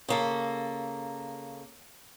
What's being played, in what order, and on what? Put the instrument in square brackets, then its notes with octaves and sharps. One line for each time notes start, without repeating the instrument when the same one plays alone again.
[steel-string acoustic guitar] C#3 A#3 A4